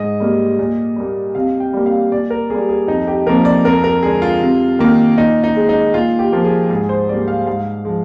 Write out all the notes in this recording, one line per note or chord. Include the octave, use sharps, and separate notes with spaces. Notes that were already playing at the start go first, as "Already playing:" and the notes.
Already playing: G#2 D#5
G3 A#3
A#2
G3 A#3
C3 F5
G5
G3 A#3
F5
A#2 D5
A#4
G3 A#3 G#4
G#4
F2 D#4
G4
C3 F3 A#3 A#4
D5
F2 A#4
A#4
D3 G#3 G#4
F4
C3
D#3 A#3
A#2 D#4
D#4
G#3
D#4
A#2 F4
G4
F3 A#3
G#4
G#2 G#4
C5
G3 A#3 D5
F5
G#2 F5
F3 G#3